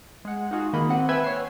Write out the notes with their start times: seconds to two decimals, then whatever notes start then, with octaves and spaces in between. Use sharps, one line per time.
0.25 G#3 F#5
0.51 D#4 F4 F#4 G#4
0.73 D#3 A#3 D#5 B5
0.89 C4 F#5
1.09 B4 E5 G5 G#5 E6 G#6
1.24 C#5 C7